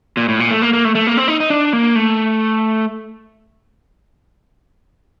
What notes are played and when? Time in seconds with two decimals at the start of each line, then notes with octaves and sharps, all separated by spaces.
0.17 A#2
0.28 A2
0.40 A#2
0.51 A3
0.62 A#3
0.73 A#3
0.85 A3
0.95 A3
1.07 A#3
1.17 C4
1.28 D#4
1.40 D#4
1.50 D4
1.73 A#3
1.96 A3